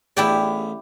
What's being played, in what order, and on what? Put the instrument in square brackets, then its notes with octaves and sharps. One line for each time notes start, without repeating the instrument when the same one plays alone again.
[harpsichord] A1 B3 G#4 [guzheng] E4 G4 D5